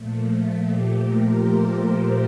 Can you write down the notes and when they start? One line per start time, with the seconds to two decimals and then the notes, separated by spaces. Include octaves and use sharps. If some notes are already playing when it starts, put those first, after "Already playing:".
Already playing: A#2 F3 A3
0.61 G4
0.96 A#4
1.32 C5